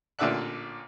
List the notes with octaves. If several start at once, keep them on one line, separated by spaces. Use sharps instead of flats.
A1 A#2 D3 D5 E5 F#6